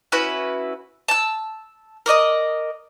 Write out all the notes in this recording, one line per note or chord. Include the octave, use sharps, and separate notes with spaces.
C#4 E4 F#4 B4
A5 E6
A#4 D5 D#5 D#6